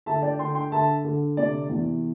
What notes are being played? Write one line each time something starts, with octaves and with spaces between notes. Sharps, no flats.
D3 E5 A5
D5 G5
D3 G5 C6
G5 C6
D3 E5 A5
D3
C3 D5
E2